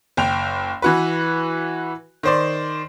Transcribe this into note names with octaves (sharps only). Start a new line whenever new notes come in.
F#1 G5 F7
E3 F#4 B4
D#3 C5 D5